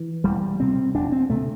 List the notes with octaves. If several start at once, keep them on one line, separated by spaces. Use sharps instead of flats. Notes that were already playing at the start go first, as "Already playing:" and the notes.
Already playing: E3
E1 G3
D2 C3 C4
E1 D4
C4
D2 C3 A3